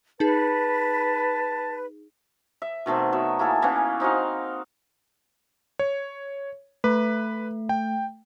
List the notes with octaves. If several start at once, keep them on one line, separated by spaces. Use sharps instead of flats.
D#4 G#4 B4 A5
E5
B2 D#3 A3 C4
F#3 B3 E5
A#3 E4 G#4 A4
E3 A#3 B3 C#4
C4 D#4 F#4 F5
C#5
A3 B4
G5